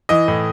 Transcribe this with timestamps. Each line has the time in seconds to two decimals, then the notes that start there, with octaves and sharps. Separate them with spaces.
0.09 E3 D#5
0.28 A2